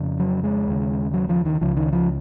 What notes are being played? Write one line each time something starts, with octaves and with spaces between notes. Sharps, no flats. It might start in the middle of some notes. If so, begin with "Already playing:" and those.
Already playing: F2 C#3
F#3
G#3
D#2 C#3
F#3
F3
D#3
C#2 C#3 F3
D#3
F3